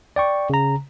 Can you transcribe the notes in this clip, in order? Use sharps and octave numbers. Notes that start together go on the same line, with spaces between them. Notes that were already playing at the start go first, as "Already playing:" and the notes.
D5 G5 C#6
C#3 A#5